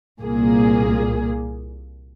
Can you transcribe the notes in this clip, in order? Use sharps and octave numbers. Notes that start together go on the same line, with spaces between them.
C2 A#2 A#3 G#4